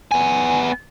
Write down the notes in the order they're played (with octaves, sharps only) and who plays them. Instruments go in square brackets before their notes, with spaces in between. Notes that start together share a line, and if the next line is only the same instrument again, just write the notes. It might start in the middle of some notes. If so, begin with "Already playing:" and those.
[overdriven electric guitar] B3 G#5